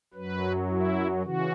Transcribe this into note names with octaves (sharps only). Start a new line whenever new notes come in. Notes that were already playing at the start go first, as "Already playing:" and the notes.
F#2 F#3 B4
E4
C#3 E3 F#4